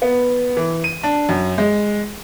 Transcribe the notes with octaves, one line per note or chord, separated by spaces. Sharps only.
B3
E3
D#7
D4
F#2
G#3